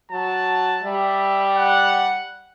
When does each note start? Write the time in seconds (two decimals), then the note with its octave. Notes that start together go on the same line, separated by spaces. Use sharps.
0.11 F#3 A5
0.83 G3 E5
1.55 F#5